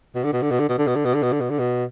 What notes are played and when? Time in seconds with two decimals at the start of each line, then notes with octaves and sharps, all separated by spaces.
0.15 B2
0.24 D3
0.33 B2
0.42 D3
0.51 B2
0.60 D3
0.69 B2
0.78 D3
0.87 B2
0.96 D3
1.05 B2
1.14 D3
1.23 B2
1.32 D3
1.41 B2
1.50 D3
1.59 B2